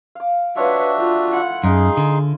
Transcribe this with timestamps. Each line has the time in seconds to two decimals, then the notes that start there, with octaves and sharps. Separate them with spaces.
0.15 F5 D6
0.56 D4 F4 F#4 B4 C#5 E5
0.98 A3 F4
1.32 E4 F4 F#5
1.64 F#2 D#4 G#4 C6
1.97 D3